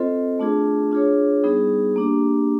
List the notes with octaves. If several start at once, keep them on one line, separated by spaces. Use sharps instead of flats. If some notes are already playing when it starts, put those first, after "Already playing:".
Already playing: C4 F4 A4 C5 D#5
A3 D4 F4 G#4
D4 F4 G#4 C#5
G3 B3 D#4 G#4
A#3 D4 G4